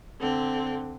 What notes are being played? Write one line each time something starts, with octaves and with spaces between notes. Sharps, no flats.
D3 C4